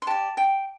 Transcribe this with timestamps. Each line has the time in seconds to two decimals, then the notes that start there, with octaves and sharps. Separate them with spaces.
0.02 C6
0.07 G4 D5 A5
0.37 G5